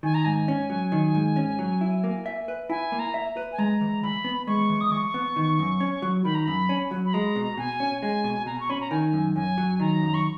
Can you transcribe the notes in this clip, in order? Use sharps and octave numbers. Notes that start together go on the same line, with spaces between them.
D#3 G#5
A#5
G#2 G#5
C#4
F#3
D#3
G#2
C#4
F#3
E4
A#3
E5
B4
E4 G#5
A#3
A#5
E5
B4
G#5
G#3 A#5
E3
E3 B5
B3
G#3 C#6
E3
D#6
E3 C#6
B3
D#3
F#2
C#4
F#3
D#3 B5
A#5
F#2 B5
C#4
F#3
B5
G#3 A#5
B2
B2 G#5
C#4
G#3 G#5
B2
B2 A#5
C#6
C#4 B5
A#5
D#3 G#5
F#2
F#2 G#5
F#3
D#3 A#5
F#2
C#6